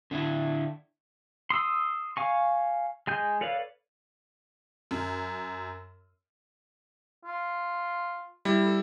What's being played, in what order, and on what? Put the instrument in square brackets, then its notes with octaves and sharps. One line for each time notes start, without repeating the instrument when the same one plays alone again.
[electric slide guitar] D3 D4 E4
[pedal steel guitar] C6 D#6 E6
F5 G#5 C#6
G#3 G#5 G6
A4 B4 C#5 D5 F5
[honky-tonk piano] F#2
[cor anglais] F4
[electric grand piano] G3 E4
[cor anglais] A4